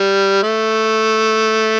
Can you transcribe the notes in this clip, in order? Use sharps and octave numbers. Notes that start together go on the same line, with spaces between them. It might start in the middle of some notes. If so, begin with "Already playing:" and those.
Already playing: G3
A3